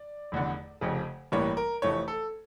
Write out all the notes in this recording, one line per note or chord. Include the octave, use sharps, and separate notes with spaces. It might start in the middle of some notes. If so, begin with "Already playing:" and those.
Already playing: D5
F1 E2 D3
F1 F2 C#3
A1 G2 E3 G3 A#3 C#5
A#4
F1 F2 E3 A3 C#5
A4